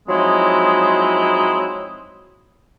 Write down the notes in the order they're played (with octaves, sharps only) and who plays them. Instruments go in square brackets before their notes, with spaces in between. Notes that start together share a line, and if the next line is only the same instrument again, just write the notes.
[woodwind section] F3 F#3 G#3 C4 D#4 E4